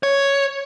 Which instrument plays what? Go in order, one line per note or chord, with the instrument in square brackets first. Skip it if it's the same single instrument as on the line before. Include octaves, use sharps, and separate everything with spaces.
[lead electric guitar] C#5